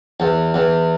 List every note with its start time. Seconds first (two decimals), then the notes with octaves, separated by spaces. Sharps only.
0.20 E2
0.54 E2